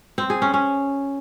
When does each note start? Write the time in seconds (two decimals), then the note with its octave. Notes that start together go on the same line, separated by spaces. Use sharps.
0.18 C4
0.30 G#4
0.42 C#4
0.54 C#4